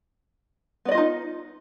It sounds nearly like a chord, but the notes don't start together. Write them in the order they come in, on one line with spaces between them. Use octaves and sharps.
B3 D5 D#5 F4 D#4